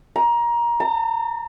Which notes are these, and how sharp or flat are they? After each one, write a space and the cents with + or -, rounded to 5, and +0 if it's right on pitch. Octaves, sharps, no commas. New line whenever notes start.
A#5 +20
A#5 -45